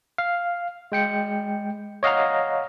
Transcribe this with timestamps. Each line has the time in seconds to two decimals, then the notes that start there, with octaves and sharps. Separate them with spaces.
0.18 F5
0.92 G#3 G5 C#7
2.03 C#5 D#5 F5 F#5 A#5